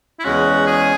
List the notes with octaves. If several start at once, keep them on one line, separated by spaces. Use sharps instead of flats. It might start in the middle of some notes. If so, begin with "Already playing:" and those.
E4
E2 C#3 G#3 C#4 F#4
G#4